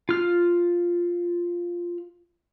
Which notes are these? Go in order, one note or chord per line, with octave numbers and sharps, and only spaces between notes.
F4 F6